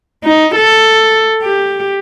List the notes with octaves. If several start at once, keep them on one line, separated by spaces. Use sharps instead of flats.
D#4
A4
G4